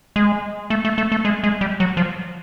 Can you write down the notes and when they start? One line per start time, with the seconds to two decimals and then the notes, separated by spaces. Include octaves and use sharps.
0.16 G#3
0.70 A3
0.85 A3
0.98 A3
1.12 A3
1.25 G#3
1.44 G#3
1.61 G3
1.80 F#3
1.97 F3